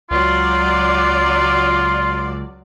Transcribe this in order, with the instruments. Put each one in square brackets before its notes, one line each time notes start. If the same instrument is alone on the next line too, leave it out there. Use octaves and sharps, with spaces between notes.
[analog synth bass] C#2 [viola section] F#3 D5 [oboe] F4